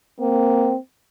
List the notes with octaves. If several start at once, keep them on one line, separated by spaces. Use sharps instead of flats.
A#3 C4